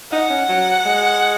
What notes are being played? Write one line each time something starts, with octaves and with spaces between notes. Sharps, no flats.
D#4 F#5
C#4
F#3
G#3